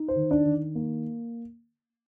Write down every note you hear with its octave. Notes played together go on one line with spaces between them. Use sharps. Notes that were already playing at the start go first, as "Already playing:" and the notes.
Already playing: D#4
C5
D#3
D4 D5
D#3
A#3